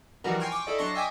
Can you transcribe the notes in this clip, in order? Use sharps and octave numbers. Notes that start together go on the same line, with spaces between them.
E3 F3 G3 D#4 F#4 A#4
G5 G#5 C6 C#6 F6
G5 C#6 D6
E4 A4 D5 D#5
F#3 D4 A5 C6 C#6 A#6
D#5 E5 G5 G#5 D6 D#6